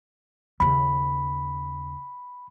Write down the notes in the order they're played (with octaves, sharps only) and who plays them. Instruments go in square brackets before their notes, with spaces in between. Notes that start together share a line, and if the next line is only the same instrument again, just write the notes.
[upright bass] D#2 C#3 [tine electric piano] B5